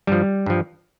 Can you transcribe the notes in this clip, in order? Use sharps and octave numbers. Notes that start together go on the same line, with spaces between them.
G2 F3 G3
G2 F3